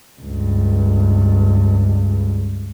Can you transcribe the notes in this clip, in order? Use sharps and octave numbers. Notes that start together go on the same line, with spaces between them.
C#2 G2